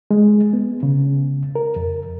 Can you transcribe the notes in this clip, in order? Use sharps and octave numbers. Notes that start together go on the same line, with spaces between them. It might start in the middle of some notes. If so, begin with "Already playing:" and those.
G#3
B3
C#3
A#4
F2